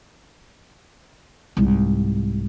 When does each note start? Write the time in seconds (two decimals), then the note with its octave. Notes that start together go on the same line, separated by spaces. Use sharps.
1.57 C2 G#2